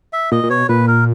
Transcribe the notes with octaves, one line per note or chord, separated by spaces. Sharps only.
E5
A#2 D#5
A#2
B2 C#5
A#2 B4
A#4